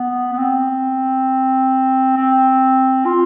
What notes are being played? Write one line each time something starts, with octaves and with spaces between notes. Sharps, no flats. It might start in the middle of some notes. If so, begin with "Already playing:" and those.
Already playing: B3
B3
C4
C4
F4